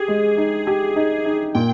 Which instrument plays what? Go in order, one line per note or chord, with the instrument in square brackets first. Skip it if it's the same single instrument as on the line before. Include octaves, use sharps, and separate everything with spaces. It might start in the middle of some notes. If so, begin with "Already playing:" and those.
Already playing: [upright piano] G4 [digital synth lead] G#4
[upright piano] G#3
D#4
G4
D#4
D#4
[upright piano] A#2 [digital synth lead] G5